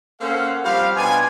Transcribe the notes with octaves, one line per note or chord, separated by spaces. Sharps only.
A#3 C#4 A4 C5 F5 F#5
F3 G3 C4 F#4 G4 F5
B2 D4 F4 G#5